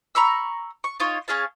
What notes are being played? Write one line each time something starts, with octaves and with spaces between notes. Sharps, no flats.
A#5 B5 C#6 E6
C#6
D#4 F4 C#5
C#4 G#4 F5 A5